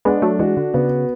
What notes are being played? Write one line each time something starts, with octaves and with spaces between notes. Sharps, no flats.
G#3 B3 D4
F#3 A3
E3 G#3 F#4
D3
C#3 B3